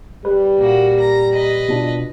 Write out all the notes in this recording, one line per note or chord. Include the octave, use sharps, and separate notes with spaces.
G3 B4
A#2 A#3 F#4
A#5
B4 D#5
B2 D4 F4